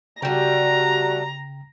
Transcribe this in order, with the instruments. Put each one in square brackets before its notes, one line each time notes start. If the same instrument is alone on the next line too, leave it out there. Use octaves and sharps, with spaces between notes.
[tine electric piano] C#3 G5 [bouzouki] G3 A3 [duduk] F#4 [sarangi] A#5